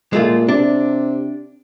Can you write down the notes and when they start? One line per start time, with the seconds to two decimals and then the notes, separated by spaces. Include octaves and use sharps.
0.13 A#2 G#3 A3 F4
0.49 C3 D4